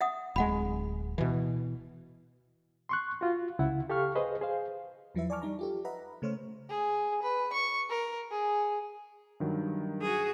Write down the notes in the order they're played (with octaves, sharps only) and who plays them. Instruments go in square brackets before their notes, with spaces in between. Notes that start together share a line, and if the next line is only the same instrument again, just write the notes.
[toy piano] E5 F#5 D#6
[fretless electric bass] D1 G#3 [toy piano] F#5 B5
[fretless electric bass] B2 E3
[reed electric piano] C6 C#6 F#6
F4 F#4
C#2 C#3 E4 F#5
G4 A4 F5 C#6 F6
G#4 B4 C5 D#5
G#4 C5 F5
[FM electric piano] E2 F3 F#3 E4 B4 E5
D5 G#5 A5 C#6 D6 F6
G3 D#4 A#5
F4 G4 A4
B4 D#5 E5 F#5 A#5 B5
C#3 A3 C5 C#5 F6
[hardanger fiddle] G#4
B4
C#6
A#4
G#4
[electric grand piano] G2 D#3 F#3
[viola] F#4 G#4